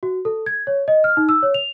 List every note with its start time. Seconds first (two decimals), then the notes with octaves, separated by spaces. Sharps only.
0.03 F#4
0.25 A4
0.46 G#6
0.67 C#5
0.88 D#5
1.04 F6
1.17 D#4
1.29 E6
1.43 C#5
1.54 F7